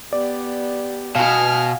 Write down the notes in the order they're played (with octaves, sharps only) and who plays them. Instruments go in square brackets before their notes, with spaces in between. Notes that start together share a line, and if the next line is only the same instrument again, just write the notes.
[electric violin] B3 G4 [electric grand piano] D5
[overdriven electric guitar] B2 [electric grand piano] F5 [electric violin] G#5 F6